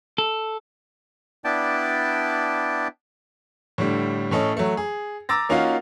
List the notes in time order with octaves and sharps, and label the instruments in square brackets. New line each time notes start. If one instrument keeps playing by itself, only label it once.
[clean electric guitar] A4
[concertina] B3 D4 E4 D5 G5 A5
[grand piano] A2 D3 G3
A2 C#4 A4 D#5
F#3 A3
G#4
A#5 D6 E6 A6 A#6
A#3 C#4 D#4 F4 F#4 F5